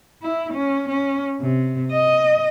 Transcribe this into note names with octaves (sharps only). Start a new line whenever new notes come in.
E4
C#4
C#4
C3
D#5